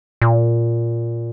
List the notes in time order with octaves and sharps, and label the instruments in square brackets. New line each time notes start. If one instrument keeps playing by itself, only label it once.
[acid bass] A#2